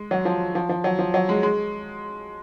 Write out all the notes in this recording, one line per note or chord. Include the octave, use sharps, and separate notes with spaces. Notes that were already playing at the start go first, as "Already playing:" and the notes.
Already playing: G#3
F#3
F3
F3
F3
F#3
F3
F#3
G#3
G#3